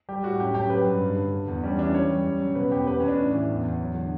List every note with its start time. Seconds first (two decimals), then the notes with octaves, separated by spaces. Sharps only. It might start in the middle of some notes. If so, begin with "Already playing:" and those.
0.09 G3 G4
0.24 A2 F#4
0.40 F#2 G4
0.54 F#2 G4
0.70 F#3 B4
0.87 G2
1.02 G2
1.17 D3
1.32 D3
1.48 E2
1.63 G3 C#4
1.78 E3 D4
1.94 F#2 C#5
2.10 G3
2.26 F#2
2.40 F#2
2.55 B2 B4
2.71 E2 G4
2.87 E2 B4
3.00 E2 C#4
3.08 D4
3.18 A2
3.33 E3
3.49 E2
3.63 E2
3.79 F#3
3.94 D3